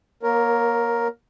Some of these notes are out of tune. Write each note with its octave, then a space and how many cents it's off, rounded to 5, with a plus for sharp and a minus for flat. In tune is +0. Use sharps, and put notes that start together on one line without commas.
A#3 +30 A#4 +5 C#5 +0